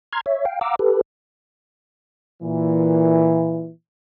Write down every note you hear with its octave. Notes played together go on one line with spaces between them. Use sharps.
A#5 C6 F6 G#6
C#5 E5
F5 G5
F5 F#5 A#5 D6 E6
G4 A4 B4
A#2 E3